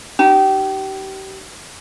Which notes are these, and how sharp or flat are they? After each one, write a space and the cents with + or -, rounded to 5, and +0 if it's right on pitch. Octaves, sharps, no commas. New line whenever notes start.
D#4 -30 G4 -30